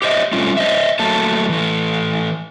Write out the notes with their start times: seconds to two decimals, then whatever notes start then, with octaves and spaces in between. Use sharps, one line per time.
0.02 G4 C5 D#5 E5
0.33 G3 A3 C4 C#4 F4
0.57 C5 D#5 E5
0.99 F#3 A3 A#3 A5
1.49 E3 A3